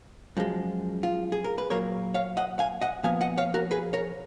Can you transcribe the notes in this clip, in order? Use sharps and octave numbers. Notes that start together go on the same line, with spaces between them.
F#2 F3 G#3
F4
G#4
A#4
B4
A#2 F#3 A#3 A#4 C#5
C#5 F5
D#5 F#5
F5 G#5
D#5 F#5
A#2 F3 B3 F5 G#5
D#5 F#5
C#5 F5
F#4 A#4
G#4 B4
A#4 C#5